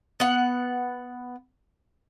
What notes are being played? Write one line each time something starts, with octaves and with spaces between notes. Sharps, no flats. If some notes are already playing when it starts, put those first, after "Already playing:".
B3 F#5